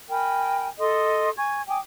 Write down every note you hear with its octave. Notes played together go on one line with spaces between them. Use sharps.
A#4 G5 G#5 B5
A4 D#5 C6 D#6
G#5 C#6 G#6
G5 G#5 D6 D#6